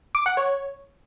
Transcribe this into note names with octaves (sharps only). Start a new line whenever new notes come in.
D6
F#5
C#5